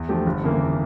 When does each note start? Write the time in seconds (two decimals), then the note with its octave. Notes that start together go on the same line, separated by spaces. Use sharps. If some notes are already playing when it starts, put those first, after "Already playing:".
Already playing: E2
0.09 D3 F3 A3 G4
0.26 G1
0.43 F2 C#3 E3 A#3